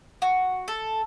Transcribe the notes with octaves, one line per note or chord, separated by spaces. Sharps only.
F#4
A4